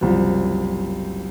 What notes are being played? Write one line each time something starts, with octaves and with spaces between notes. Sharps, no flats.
F#1 C2 F3